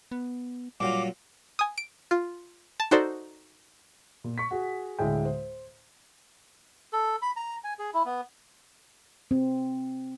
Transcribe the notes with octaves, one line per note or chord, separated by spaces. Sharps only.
B3
A#2 F#3 G3 F4 D6
G#5 D#6
D7
F4
A5
D#4 F#4 A4 C5 D5
A#2
C#6 B6
F#4 G#4
D2 A2 G#3 G5
C5
A4
B5
A#5
G#5
G#4
E4
B3
C4